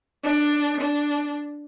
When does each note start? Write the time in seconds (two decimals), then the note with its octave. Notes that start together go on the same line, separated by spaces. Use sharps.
0.24 D4
0.81 D4